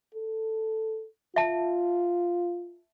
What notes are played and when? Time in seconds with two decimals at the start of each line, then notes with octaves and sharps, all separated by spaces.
0.15 A4
1.36 F4 E5 A5